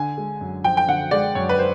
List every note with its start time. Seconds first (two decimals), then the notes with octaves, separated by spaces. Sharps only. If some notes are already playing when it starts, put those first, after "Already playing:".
Already playing: D3 G#5
0.17 G#3
0.41 F#2
0.64 F3 G5
0.77 G5
0.88 D3 F#5
1.11 G#3 D5
1.35 F#2 C#5
1.49 B4
1.59 C5